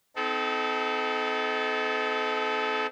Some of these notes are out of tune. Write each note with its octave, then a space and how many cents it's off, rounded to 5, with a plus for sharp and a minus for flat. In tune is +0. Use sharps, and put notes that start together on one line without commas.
C4 -35 D#4 +20 A4 -25